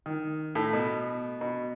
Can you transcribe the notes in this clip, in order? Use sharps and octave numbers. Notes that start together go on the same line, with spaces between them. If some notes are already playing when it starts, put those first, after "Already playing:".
D#3
A2
B2
B2